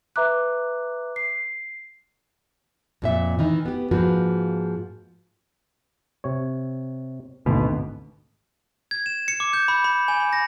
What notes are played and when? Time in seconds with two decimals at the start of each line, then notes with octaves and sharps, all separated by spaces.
0.16 B4 E5 A#5 D6 F#6
1.16 C7
3.02 F2 A#2 E5
3.39 D#3 E3 D#4
3.65 B3 G4
3.91 G#2 F3 A#3 F#4 B4
6.24 C3 C#5
7.46 G#1 D2 B2
8.91 G#6
9.06 E7
9.28 C#7
9.40 D6
9.53 G6
9.68 B5
9.84 B5
10.08 G#5
10.20 B5
10.33 A#6